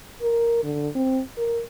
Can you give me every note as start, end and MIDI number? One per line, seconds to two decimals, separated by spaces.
0.22 0.63 70
0.63 0.88 50
0.95 1.21 60
1.37 1.61 70